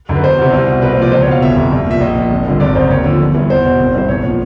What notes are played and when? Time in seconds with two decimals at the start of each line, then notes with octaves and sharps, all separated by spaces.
0.09 F#2 D3
0.16 B4
0.23 E1 C5
0.38 E2 C3
0.52 C2
0.67 B2
0.82 C2 B4
0.92 C5
0.97 A#2 F3 D5
1.12 C#2 C5
1.22 C#5
1.28 B2 F5
1.42 G1 E5
1.56 F2 C3
1.72 C2
1.87 A#2 F3 E5
2.01 A#1 D#5
2.16 A#2 F3
2.31 G#1
2.46 G2 D3 F3
2.60 G#1 D5
2.75 F#2 C#3 C5
2.90 D#2 C#5
3.04 D3 F3
3.20 G1
3.34 G2 E3
3.50 E2 C5
3.65 B2
3.79 G#1
3.95 G2 E3 C5
4.09 B1 C#5
4.24 A#2 F3